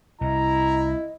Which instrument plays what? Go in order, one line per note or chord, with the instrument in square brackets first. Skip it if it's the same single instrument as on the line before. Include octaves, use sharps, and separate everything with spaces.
[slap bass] C2 C3 [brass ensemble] E4 [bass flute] D#5 [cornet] A#5